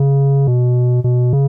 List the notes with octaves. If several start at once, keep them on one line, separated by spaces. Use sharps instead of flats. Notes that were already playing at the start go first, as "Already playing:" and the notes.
Already playing: C#3
B2
B2
C#3